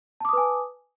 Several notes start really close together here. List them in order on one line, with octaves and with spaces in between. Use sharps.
A5 D6 D#6 B4 G#5